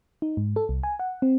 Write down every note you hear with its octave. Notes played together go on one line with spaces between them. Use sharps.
D#4
G#2
A4
C2
G#5
F#5
C4